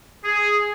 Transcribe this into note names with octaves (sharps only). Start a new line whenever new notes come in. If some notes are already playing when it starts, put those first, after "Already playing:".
G#4